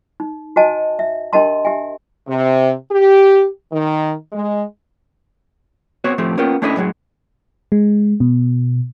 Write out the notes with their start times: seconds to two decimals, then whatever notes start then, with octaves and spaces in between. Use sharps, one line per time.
0.20 D#4
0.56 F#4 C5 D#5 G#5 A5
0.99 E5
1.33 D4 G4 A#4 D#5 A5 C6
1.65 G4 E5 G#5
2.28 C3
2.91 G4
3.73 D#3
4.33 G#3
6.04 B3 C4 F#4 C#5
6.18 A2 F3 A3 C4 G4
6.37 A#3 B3 C#4 F4 A#4 G5
6.62 A3 C#4 D4 E4 A4 D#5
6.76 F#2 A2 F#3 G#3
7.72 G#3
8.20 B2